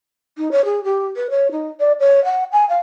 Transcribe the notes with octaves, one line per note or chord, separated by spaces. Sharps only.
D#4
C#5
G#4
G4
B4
C#5
D#4
D5
C#5
F#5
G#5
F5